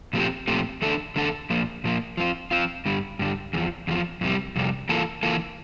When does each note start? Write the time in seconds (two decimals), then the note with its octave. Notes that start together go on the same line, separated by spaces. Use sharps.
0.13 A#2 F3 A3 C4 G4
0.47 A#2 F3 A3 C4 G4
0.82 E2 D3 A3 D4 A4
1.16 E2 D3 A3 D4 A4
1.50 A#2 F3 A#3
1.84 A#2 F3 A#3
2.17 F3 C4 F4
2.51 F3 C4 F4
2.86 G2 D3 G3
3.19 G2 D3 G3
3.53 E2 D3
3.57 F3
3.87 E2 D3 F3
4.21 F2 C3 G3
4.56 F2 C3 G3
4.89 E3 A#3 F4 A4
5.23 E3 A#3 F4 A4